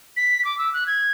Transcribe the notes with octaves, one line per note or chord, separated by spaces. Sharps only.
B6
D6
E6
F#6
G#6